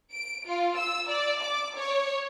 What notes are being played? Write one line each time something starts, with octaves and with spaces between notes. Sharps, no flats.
D7
F4
E6
D5
D6
C#5